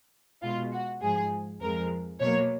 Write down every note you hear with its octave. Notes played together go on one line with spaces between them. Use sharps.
B2 G#3 F4
F#4
G#2 F3 G#3 G#4
F2 F3 G#3 A#4
B2 F#3 A#3 C#5